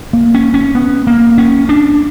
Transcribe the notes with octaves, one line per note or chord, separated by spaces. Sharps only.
A#3
C#4
C#4
B3
A#3
C#4
D4